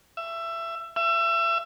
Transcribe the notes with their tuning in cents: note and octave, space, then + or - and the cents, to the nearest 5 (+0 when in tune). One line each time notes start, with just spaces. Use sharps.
E5 +20
E5 +30